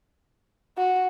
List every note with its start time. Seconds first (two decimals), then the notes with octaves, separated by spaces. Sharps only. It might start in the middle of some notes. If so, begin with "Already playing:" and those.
0.78 F#4